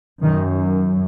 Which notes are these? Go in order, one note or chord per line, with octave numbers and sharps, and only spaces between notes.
F#2 D#3